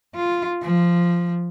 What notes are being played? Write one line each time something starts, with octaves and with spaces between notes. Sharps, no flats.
F4
F3